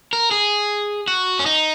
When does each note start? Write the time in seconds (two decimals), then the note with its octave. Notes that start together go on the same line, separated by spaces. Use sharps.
0.13 A#4
0.31 G#4
1.08 F#4
1.39 C#4
1.46 D#4